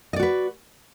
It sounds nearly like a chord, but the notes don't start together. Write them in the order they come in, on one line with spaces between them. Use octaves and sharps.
D#5 D5 F#4 B4